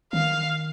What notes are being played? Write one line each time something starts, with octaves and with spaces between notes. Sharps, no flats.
D#3 F5